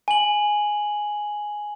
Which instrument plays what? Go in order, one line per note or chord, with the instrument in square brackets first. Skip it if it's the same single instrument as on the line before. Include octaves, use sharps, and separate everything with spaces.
[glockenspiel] G#5 F#7